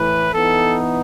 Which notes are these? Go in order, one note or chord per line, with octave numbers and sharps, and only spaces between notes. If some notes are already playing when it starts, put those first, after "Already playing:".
Already playing: A2 E3 A3 B4
E3 B3 D#4 A4